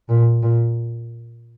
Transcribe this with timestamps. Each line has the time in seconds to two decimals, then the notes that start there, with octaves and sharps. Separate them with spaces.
0.09 A#2
0.43 A#2